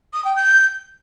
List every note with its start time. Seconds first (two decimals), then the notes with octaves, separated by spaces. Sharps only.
0.14 D#6
0.25 G5
0.36 G6